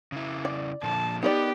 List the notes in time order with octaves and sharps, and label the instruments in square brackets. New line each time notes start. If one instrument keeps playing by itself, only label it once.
[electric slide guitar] C#3 E4
[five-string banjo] D5
[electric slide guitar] A#2 D3 F3 [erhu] A5
[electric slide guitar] B3 [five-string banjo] D#4 A#4 D5 [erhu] G4